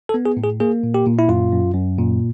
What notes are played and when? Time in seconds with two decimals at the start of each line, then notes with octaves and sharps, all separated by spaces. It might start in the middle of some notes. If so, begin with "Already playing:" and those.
0.09 A4
0.14 B3
0.26 G#4
0.37 A2
0.43 G#4
0.60 A#3 G#4
0.84 A#2
0.94 G4
1.06 A#2
1.19 E4
1.29 F#2 F4
1.52 F#2
1.74 F#2
1.98 A#2